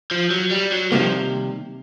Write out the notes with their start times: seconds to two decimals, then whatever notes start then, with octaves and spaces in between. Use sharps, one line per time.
0.11 F3
0.31 F#3
0.51 G3
0.72 F#3
0.92 C3 D#3 F3 G3 A#3